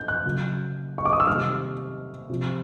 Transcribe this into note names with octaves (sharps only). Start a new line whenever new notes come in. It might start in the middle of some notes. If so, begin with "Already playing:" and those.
Already playing: B2 G6
F#6
C#3 F#3
C#6
D6
D#6
E6
C3 D#3 G3 F6
C3 F3